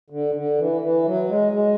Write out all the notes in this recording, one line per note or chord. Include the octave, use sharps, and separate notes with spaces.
D3
D3
E3
E3
F#3
G#3
G#3